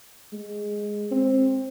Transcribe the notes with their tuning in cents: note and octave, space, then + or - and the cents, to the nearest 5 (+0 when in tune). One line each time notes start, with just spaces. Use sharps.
G#3 +0
C4 +15